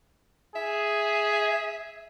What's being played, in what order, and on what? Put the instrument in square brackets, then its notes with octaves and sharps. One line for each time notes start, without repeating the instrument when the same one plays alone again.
[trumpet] G#4 [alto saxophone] E5